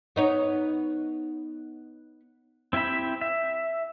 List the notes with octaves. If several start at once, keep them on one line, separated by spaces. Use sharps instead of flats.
B3 D#4 C#5
C4 E4 G4 E5 B5
E5